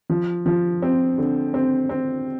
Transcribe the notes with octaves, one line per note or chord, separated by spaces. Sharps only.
F3
F3
C4
D3
C4
C4